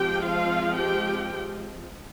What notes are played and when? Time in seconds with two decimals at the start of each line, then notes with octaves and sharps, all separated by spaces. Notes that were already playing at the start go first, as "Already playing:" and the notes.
Already playing: F3 G#3 C4 G4 G5
0.23 F4 F5
0.77 G4 G5